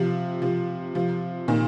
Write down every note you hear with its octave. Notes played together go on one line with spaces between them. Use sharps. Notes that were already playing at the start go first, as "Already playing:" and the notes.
Already playing: C3 F3
C3 F3
C3 F3
A#2 D#3